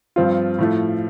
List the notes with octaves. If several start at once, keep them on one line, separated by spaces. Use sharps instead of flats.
G2 F3 C4 F4
A2 F3 A3